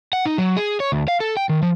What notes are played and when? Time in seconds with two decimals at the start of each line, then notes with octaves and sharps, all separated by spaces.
0.13 F#5
0.26 D#4
0.38 F#3
0.57 G#4
0.80 C#5
0.92 D2
1.08 F5
1.20 A4
1.37 G5
1.49 D#3
1.62 F3